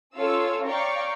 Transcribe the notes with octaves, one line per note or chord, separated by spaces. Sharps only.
C#4 F4 A4 C#5 F5 E6
C#5 D5 F5 G5 A#5 C#6